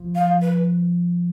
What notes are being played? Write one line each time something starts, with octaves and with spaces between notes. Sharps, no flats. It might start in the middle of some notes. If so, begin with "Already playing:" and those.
Already playing: F3
F5
B4